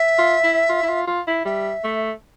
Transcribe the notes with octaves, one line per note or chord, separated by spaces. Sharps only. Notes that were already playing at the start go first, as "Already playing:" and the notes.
Already playing: E5
F4
E4
F4
E4
F4
F4
E4
G3 E5
A3